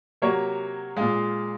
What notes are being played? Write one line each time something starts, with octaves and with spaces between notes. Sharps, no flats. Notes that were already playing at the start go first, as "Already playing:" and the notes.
C3 F#3 A#3 C#5
A#2 G#3 F5